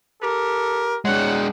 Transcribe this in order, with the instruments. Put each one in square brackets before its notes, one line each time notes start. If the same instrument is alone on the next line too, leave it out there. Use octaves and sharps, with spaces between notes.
[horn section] G4 A4 A#4
[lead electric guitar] G#3 D4 [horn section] C#5 F#5